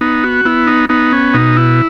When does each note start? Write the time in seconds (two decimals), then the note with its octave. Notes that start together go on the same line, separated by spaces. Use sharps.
0.01 B3 D#4
0.24 F#4
0.45 B3 E4
0.67 D#4
0.89 B3 D#4
1.12 C#4
1.34 B2 D#4
1.56 E4